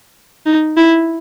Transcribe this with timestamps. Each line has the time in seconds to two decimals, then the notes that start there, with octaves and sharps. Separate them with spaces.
0.46 D#4
0.77 E4